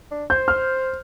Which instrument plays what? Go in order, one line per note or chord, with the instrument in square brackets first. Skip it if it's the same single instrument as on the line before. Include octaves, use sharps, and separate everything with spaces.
[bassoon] D4
[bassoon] C5 [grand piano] G6
[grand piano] F6